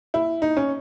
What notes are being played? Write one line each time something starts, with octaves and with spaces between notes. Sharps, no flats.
E4
D#4
C#4